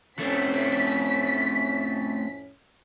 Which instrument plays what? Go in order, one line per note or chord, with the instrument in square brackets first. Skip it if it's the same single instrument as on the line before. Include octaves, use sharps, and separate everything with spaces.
[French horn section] F2 A2 C#4 [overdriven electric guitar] A3 C4 [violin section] B6